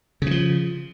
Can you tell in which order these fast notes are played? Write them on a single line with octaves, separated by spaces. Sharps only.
C#3 E3 F3